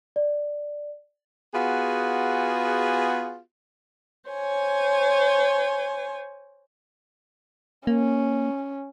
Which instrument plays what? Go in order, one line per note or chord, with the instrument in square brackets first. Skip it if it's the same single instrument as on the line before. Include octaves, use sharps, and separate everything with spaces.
[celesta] D5
[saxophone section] B3 F4 F#4 G#4
[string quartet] C5 C#5 G#5
[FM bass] A#3 [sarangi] C#4